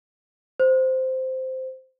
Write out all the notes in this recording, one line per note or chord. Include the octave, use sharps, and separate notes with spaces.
C5